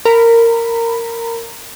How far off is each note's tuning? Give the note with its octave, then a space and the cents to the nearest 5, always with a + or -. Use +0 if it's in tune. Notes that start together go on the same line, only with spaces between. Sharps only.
A#4 -15 B5 +0